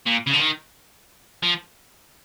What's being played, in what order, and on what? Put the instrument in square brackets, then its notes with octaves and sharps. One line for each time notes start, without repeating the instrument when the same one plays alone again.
[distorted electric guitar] A#2
C#3
D3
D#3
F3